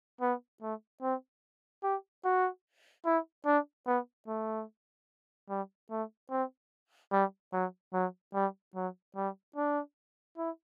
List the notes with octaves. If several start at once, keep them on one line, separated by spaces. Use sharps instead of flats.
B3
A3
C4
G4
F#4
E4
D4
B3
A3
G3
A3
C4
G3
F#3
F#3
G3
F#3
G3
D4
E4